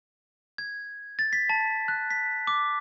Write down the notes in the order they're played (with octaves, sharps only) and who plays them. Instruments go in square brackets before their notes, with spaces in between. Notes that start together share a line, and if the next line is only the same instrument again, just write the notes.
[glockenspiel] G#6
A6
B6
A5
F#6
B6
D6